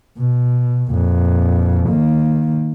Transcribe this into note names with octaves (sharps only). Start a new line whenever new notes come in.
B2
F2 A#2
D#3 A#3